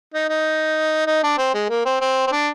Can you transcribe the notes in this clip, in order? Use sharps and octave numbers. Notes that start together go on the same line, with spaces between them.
D#4
D#4
D#4
D4
C4
G#3
A#3
C4
C4
C4
D4